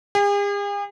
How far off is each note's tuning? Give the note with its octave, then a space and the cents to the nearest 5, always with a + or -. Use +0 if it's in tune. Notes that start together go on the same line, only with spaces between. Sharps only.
G#4 -45